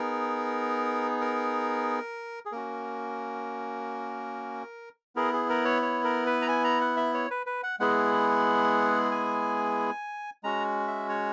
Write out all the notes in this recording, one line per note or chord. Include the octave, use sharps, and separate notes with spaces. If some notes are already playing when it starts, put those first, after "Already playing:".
Already playing: B3 D#4 G#4 A#4
A#4
G#4
A#3 C#4 F#4 A#4
B3 E4 G#4 A#4
G#4
A#4
C#5
C#5
A#4
B4
A#5
G#5
A#5
F#5
E5
C#5
B4
B4
F#5
G#3 B3 E4 G#4 F#5
G#5
G#3 C#4 F#4 A#5
E5
C#5